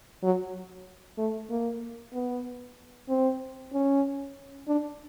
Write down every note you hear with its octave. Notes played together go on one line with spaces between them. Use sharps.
F#3
A3
A#3
B3
C4
C#4
D4